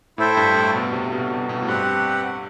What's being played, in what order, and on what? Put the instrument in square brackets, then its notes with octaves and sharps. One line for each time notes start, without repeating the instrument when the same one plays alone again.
[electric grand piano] A2 [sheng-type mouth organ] E4 A4 C5 E5 G5
[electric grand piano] G2
A2
B2
C3
B2
B2
B2
A2
[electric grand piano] G2 [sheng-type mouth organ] C4 G4 B4 F#5